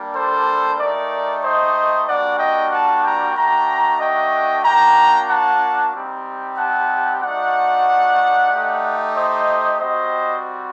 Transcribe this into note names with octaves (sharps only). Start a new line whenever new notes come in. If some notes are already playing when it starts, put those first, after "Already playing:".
Already playing: G3 A#3 D4
A4 C5
A3 D#4 G4 A#4 D5
C5 D#5
G3 A#3 D4 F#4 D5 F#5
D#5 G5
F#5 A5
G5 A#5
A3 D4 F#4 G5 A#5
D#5 G5
A#3 D4 F#4 G5 A#5
F#5 A5
G3 C4 D#4 G4
F#5 A5
A3 D#4 F#4 D5 F#5
A3 D#4 G4
C5 D#5
G3 C4 F#4 C5 D#5